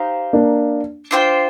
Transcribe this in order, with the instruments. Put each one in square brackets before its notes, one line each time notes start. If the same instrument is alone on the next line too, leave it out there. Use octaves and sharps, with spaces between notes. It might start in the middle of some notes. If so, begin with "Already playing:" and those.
Already playing: [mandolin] D#4 G4 C5 F5
[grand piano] A#3 D4
[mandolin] D4 F4 C5 G5